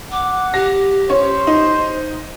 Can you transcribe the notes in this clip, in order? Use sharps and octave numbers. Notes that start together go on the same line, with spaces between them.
F#5 D6
G4 A#6
C#4 C5 C#5
D#4